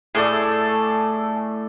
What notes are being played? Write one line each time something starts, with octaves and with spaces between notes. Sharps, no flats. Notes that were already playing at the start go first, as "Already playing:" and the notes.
A2 A3 G#4 A4 D5